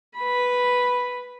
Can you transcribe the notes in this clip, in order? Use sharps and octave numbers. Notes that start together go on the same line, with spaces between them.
B4 B5